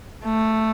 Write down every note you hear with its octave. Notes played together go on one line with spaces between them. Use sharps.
A3